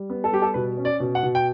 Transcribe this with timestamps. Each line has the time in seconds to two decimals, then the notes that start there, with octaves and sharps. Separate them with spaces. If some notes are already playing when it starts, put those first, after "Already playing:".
Already playing: G3
0.10 B3
0.24 A4
0.31 G3 G4
0.42 A4
0.54 B2 B4
0.77 C#4
0.85 D5
1.00 B2
1.15 F#5
1.23 B2
1.35 G5